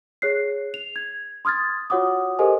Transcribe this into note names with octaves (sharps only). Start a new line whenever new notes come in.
G#4 C#5 F#6 C7
F7
G#6
C6 D#6 F6 G#6 A6
F4 F#4 C#5 F#5 D6 D#6
G4 A4 A#4 C5 D#5 G#5